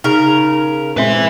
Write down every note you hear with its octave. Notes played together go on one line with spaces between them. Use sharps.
C#3 D#4 A#4
A#2 G#3 C4 B4 E5